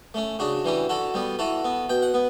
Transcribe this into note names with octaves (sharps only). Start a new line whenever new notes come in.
A3 C#4
C#3 D4 F#4
E3 G3 C#4
D3 F#4 A4
G3 B3
E3 F#4 A4
B3
B2 G5
F#5
B3